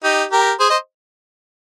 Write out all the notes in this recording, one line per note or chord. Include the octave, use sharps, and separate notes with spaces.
D#4 G4
G4 A#4
G#4 C5
C5 D#5